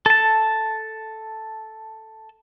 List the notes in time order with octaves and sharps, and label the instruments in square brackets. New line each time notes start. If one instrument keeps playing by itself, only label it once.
[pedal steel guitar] A4 A5